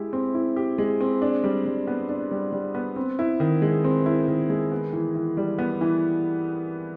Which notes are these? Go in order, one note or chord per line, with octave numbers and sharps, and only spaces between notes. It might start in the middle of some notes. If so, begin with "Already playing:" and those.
Already playing: G#3 E4 G4
C4
E4
G4
G#3
C4
D4
G3
G3
B3
D4
G3
G3
B3
C4
E4
D#3
G#3
C4
E4
D#3
G#3
B3
E3
E3
G3
B3
E3